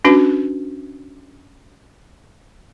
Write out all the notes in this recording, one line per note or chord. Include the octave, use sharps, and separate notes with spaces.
C#4 D4 F#4 B4